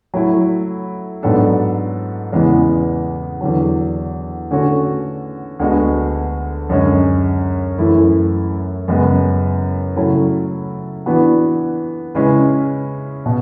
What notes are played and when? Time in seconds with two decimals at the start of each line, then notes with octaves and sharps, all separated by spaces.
0.14 F#3 A3 E4 A4
1.23 G#2 F#3 B3 D4 A4
2.32 E2 C#3 E3 G#3 B3
3.41 E2 D3 F#3
4.51 D3 A3 C#4 F#4 A4
5.59 D2 D3 G#3 B3 F#4
6.70 F#2 D3 G#3 C#4
7.78 F#2 E3 A3 E4
8.88 F#2 C#3 G#3 B3
9.96 C#3 F#3 A3 E4 A4
11.06 E3 B3 D4 F#4
12.15 C#3 G#3 C#4 E4 B4
13.26 B2